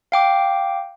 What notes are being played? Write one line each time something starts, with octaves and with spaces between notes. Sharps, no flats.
F5 G5 D6